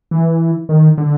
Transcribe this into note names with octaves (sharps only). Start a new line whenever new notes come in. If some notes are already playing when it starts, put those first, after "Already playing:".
E3
D#3
D3